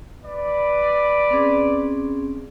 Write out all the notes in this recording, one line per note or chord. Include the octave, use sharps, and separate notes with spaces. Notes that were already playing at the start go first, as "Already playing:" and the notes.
B4 D5
C4 C#4 G#4